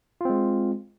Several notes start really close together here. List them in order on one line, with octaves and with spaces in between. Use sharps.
F4 C4 G#3